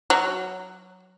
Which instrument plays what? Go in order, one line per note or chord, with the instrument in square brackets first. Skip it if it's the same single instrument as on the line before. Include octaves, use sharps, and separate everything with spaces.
[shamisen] F#3